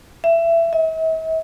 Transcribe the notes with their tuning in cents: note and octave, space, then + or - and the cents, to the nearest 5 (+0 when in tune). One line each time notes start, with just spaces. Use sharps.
E5 +20
E5 -45